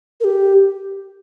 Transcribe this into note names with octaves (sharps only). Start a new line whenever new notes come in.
A#4
G4